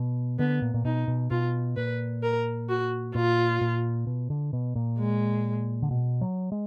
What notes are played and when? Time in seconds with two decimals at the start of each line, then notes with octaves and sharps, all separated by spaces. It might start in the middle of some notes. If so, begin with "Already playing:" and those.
Already playing: B2
0.39 D3 B3
0.62 A#2
0.74 A#2
0.85 B2 D#4
1.08 B2
1.30 B2 F4
1.77 A#2 B4
2.23 A#4
2.69 F#4
3.15 A#2 F4
3.61 A#2
4.07 B2
4.30 D3
4.53 B2
4.75 A#2
4.99 G#3
5.82 D3
5.91 B2
6.21 F#3
6.52 G#3